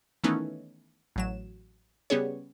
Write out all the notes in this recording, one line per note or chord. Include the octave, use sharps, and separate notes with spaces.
D#3 E3 A3 B3 C#4 D#4
A1 F#3 E7
C#3 G3 B3 C#4 G#4 C#5